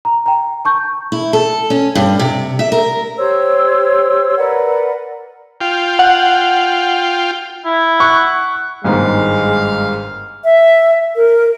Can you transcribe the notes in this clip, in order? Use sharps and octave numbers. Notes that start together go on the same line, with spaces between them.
A#5
G5 A#5
A5 C#6 G6
E4
A4
C#4
G2
C3
E5
A#4
G4 C5 C#5 E6
A#4 B4 D5 F#5
F4 G5
F#5
E4
F#5 C#6
G1 G#2 D#3 G#3 F5
E5
A#4